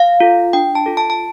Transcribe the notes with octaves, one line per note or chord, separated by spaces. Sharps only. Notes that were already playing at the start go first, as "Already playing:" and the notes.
Already playing: F5
F4 A4
D4 G5
A5
F4 A4
A5
A5